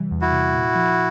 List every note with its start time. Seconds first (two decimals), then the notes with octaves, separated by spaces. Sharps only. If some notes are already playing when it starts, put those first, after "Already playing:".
Already playing: C3 E3 G3
0.11 E2
0.21 E4 F#4
0.32 C3
0.54 A#2
0.75 F3